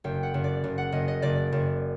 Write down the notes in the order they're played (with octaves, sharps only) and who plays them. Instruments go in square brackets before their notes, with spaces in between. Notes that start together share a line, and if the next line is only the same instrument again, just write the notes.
[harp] F#1 G5
F#5
F#1
D5
F#1
F#5
F#1 D#5
D#5
F#1 D5
F#1